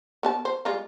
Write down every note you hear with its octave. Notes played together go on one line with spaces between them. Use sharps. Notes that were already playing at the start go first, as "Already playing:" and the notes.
B3 G4 A5
C5
G3 G#3 F4